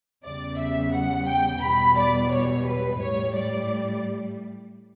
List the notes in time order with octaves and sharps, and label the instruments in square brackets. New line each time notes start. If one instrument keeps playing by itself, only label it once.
[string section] E2 C#3 G3 D5
E5
F#5
G5
E2 B2 G3 B5
D5
C#5
B4
A2 G3 C#5
D5